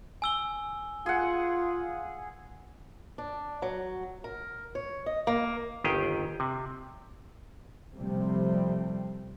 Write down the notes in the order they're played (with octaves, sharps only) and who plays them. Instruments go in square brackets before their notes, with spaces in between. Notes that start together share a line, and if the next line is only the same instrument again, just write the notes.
[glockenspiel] G#5 E6 G7
[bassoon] F4 [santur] G#4 F#5
[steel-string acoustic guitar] D4
F#3
A#4
C#5
D#5
A#3
[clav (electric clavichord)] G1 D#2 D#3 G4 G#4 G5
C3
[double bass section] C3 F3 G3 A3 C4